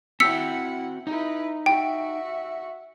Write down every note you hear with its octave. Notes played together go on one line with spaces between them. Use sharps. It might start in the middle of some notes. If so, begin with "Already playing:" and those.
C4 E4 F#4 F#5 G5 E6 B6 C#7
D#4 E4 B4 D#5
F#4 E5 G5